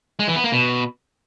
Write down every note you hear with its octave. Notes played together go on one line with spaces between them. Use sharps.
G#3
E3
B3
A#3
B2